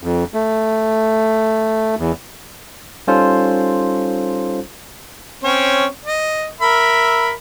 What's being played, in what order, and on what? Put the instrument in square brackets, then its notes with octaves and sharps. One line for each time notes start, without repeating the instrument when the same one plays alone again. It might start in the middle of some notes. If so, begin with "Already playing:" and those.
[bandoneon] F2
A3
E2
[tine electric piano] G3 C#4 D#4 F4 A4 C5
[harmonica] C4 C#4 C#5
D#5
A#4 E5 B5